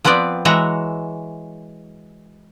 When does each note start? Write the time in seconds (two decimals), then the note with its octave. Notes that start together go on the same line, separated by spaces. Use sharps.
0.04 F3 B3 C4 B4 D5
0.45 E3 G#3 F#4 C#5 E5 A#5